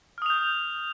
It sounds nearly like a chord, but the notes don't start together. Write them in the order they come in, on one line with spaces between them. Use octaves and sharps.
F6 D#6 F7 G6